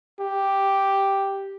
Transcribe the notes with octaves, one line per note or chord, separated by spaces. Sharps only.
G4